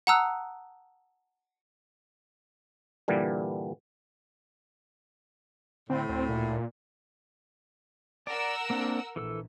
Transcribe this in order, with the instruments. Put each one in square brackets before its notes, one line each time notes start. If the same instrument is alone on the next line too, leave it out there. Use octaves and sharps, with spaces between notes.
[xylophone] F#5 A5 A#5 D#6 E6 F#6
[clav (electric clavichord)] G2 A#2 D3 E3 G3
[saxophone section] A2 [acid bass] D3 [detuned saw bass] C4
[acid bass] D2 [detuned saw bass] C4
[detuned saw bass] A#2
[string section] A#4 F#5 E6 [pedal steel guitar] D5
[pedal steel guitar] A#3 C4 D4
[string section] A#1 [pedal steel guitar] E3 A4 E6